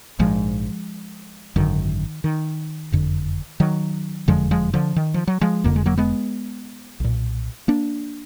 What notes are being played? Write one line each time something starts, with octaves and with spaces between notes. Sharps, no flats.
A#1 G#2 F3 G#3
G#1 F#2 D3 D#3
D#3
F#1 F2 D3
D#3 F#3
F#1 F2 D3 F3 G#3
F3 G#3
D3 F3
D#3
F3
F#3
F3 G#3
F1 F2 D3 A#3
G#3
F#3 A#3
G#3 B3
B1 A#2
A#3 D4